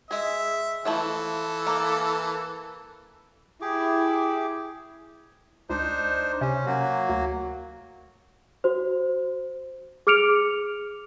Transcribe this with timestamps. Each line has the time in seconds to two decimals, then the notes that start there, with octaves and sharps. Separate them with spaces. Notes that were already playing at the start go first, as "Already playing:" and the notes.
0.11 G#3 G#4 E5
0.85 E3 F3 A3 E4 A4
1.67 A#3
3.61 E4 G4 G#4 D6
5.70 C#2 D4 D#4 C5
6.41 C3 C#4
6.66 F#3 A#3 F#4
7.09 D2
8.64 F#4 C5
10.07 G#4 D6 F6 C#7 D7 F7